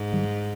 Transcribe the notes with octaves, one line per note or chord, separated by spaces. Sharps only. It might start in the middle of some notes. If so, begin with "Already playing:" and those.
Already playing: G#2
D#3 G3